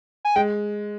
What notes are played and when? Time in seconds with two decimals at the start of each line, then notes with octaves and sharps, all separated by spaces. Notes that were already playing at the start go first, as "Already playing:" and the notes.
0.25 G#5
0.36 G#3 G5